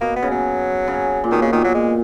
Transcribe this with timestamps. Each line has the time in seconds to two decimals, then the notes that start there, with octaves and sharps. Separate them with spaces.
0.01 B2 A#3
0.16 B3
0.23 C#3
0.31 F#3
0.88 C#3
1.24 A#2
1.31 B2 D#3
1.42 C#3
1.52 A#2 D#3
1.64 F#3
1.74 G#3